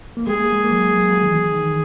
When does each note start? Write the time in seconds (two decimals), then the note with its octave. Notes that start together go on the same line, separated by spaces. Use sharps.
0.17 A#3
0.27 G#3 G#4
0.39 A#3
0.52 G#3
0.64 A#3
0.71 F#3
0.78 G#3
0.94 F#3
1.10 F#3
1.22 D#3
1.27 E3
1.52 D#3